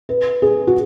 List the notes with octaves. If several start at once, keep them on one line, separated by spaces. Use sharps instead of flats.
B4
G#4
F#4